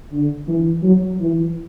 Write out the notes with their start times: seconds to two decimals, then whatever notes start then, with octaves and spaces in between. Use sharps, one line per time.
0.11 D3
0.48 E3
0.83 F#3
1.19 E3